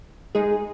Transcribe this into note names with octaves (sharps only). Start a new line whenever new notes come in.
G#3 D#4 G#4